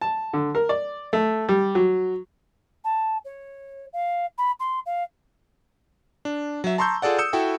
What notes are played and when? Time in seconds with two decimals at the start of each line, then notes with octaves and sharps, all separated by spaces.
0.01 A5
0.33 D3
0.55 A#4
0.69 D5
1.13 A3
1.49 G3
1.75 F#3
2.84 A5
3.25 C#5
3.93 F5
4.38 B5
4.60 C6
4.86 F5
6.25 D4
6.64 F#3 E5
6.78 A5 A#5 C6 C#6 E6 G6
7.02 F4 G#4 A4 D5 F#5
7.18 D#6 E6 G6 C#7 E7
7.33 E4 F#4 A4 G5